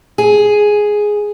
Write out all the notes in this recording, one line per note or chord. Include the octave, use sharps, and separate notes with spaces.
G#4